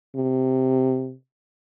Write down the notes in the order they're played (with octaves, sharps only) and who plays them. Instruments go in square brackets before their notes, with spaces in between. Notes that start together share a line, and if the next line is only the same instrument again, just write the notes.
[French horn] C3